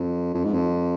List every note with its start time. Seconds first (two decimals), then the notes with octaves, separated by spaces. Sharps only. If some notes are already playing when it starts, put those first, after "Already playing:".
Already playing: F2
0.34 F2
0.44 G#2
0.54 F2